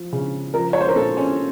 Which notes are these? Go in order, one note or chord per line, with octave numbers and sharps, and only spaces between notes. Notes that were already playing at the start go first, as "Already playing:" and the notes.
Already playing: F3
C#3
F3 A#4
C#5
C5
A#4
A#2 A4
C#4